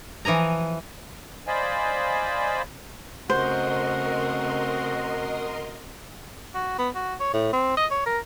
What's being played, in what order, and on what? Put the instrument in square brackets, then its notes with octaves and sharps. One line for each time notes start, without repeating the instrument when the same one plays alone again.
[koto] E3 F3 G#5 A#5
[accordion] C5 D5 D#5 F5 G#5 B5
[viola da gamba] C#3 A3 C4 [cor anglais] F#4 [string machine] A#4 D#5 C6 [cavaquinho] C5
[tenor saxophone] F#4
B3
F#4
C#5
A2
C4
D#5
C#5
A#4